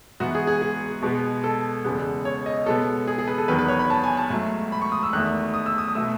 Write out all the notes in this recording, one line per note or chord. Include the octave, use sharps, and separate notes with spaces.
G#2 E3 B3 F#4
G#4
G#4
G#4
B2 G#3 B3
A4
E2 C#3 G#3 B3
C#5
D#5
B2 G#3 B3 A4
G#4
G#4
B4
A4
E2 D#3 F#3 B3 B4
B4
C#5
B5
A5
G#5
A5
G#2 F#3 A3
B5
C#6
D#6
E6
E2 D#3 A3 F#6
D#6
E6
D#6
D#6
B2 A3 E6